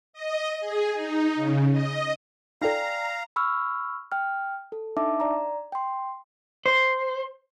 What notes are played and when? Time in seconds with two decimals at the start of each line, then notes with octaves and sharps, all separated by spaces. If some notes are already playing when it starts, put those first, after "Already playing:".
0.13 D#5
0.60 G#4
0.94 D#4
1.35 C#3
1.72 D#5
2.61 D#4 F4 A4 D5 F5 G5 G#5 A#5
3.36 B5 C#6 E6 F6
4.12 G5 F6
4.72 A4
4.97 D4 D#4 E5 A5 D6
5.20 D5 A#5
5.72 G5 C6
6.66 C5